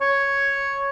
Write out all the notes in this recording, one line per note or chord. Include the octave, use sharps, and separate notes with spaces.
C#5